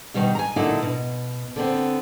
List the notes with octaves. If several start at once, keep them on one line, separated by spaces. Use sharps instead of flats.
B2 D#3 G3 D#4
G#5 A#5
A#2 D3 F#3 D#4 E4
B2
D3 B3 C4